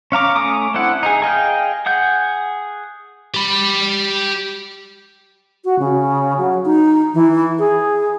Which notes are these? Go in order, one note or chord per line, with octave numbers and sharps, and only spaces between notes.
C#4 F5 A#5 D6
A3 C#4 D6 D#6
C4 D4 E4 F#5
D#4 G#4
G#4 D#5 F5 G5
G#4 F#5 G6
G4 B5
F#4
C#3
F#3
D#4
E3
G#4